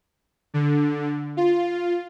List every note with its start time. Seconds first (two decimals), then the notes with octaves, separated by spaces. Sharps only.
0.54 D3
1.37 F4